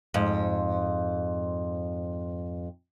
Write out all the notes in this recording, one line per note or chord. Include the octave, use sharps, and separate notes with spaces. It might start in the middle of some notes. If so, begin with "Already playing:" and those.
F2 G#2